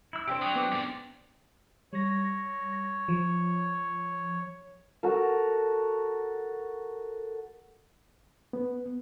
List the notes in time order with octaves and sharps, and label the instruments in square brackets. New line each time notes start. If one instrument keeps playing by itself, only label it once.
[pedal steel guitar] E4 E6
[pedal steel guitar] C4 D4 G5 [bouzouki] G4 G#4 C5
[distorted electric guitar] F#3 [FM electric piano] D#6
[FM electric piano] B3 D6
[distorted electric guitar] G#2 D5
[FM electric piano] G3 A#6 [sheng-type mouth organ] C#5
[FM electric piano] F3
[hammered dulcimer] F#4 A4 A#4
[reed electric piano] B3